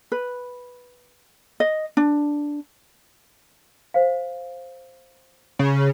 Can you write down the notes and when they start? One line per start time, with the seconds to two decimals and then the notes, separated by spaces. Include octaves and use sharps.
0.12 B4
1.60 D#5
1.97 D4
3.94 C5 F5
5.59 C#3